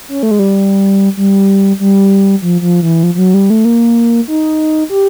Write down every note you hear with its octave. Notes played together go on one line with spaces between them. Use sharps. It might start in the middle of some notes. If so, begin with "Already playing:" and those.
C#4
A3
G#3
G3
G3
G3
F3
F3
E3
F3
F3
F#3
G3
A3
A#3
D#4
G4